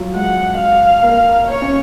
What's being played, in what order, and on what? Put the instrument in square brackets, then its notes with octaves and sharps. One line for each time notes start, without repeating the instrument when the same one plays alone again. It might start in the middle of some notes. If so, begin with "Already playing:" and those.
Already playing: [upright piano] F#3 F4
[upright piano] G#3 [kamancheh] F#5
[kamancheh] F5
[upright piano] A#3
[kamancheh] C#5
[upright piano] C#4